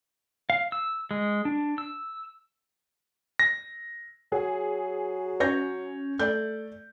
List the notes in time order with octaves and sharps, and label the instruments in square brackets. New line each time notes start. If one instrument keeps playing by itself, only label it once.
[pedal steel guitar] F5
E6
G#3
D4
E6
[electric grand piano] A#6
[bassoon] F#3 [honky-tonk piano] G#4
[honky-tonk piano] C#4 [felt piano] C#5 G6 A#6
[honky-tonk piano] A3 [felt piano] D5 G6